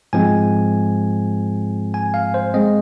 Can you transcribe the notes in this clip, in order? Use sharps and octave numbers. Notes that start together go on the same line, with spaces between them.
G#2 F3 G#3 C4 G#5
G#5
F5
C5
G#3 C4 D#5